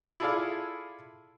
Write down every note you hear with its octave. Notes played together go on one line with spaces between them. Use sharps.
E4 F4 G#4 A4 D5 F5